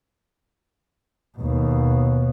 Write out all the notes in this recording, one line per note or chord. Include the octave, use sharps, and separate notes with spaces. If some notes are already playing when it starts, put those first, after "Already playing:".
D#2 B2